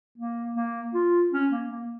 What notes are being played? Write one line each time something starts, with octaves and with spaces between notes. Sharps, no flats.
A#3
A#3
F4
C#4
A#3
A#3